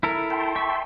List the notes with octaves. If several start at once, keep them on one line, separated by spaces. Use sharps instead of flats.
E4 A4 A#4
G5 A5 C6
E5 C#6